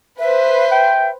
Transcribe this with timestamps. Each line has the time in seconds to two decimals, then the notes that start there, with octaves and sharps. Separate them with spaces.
0.19 B4 C5 E5
0.72 G5